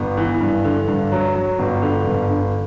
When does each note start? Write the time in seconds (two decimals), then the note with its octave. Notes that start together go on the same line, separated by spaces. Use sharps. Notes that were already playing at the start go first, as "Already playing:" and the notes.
Already playing: G1 B3
0.17 E3
0.41 G2
0.64 D3
0.88 G2
1.12 F#3
1.35 F#3
1.59 G1
1.82 D3
2.06 G1
2.30 D3